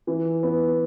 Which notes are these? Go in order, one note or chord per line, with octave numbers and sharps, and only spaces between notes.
E3
B3